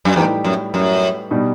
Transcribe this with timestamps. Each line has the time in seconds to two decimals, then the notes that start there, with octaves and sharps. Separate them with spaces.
0.05 F#2
0.16 E2 A2 G3 D#4 G4 B4
0.44 F#2
0.74 F#2
1.31 B2 G3 D#4